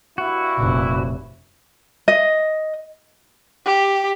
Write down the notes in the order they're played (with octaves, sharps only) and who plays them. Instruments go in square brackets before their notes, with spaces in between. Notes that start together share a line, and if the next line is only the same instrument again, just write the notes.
[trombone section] G2 E4 [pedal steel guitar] F#4
[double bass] F1 A#2
[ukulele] D#5
[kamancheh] G4